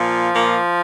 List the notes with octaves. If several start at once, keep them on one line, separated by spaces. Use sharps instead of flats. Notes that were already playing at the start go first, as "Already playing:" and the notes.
Already playing: A#2 F3
A#2 A#3